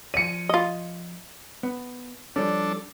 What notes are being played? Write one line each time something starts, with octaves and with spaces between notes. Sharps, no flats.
F3 D5 C#7 D#7
F4 D#5
B3
F3 G3 C#4 D4 A4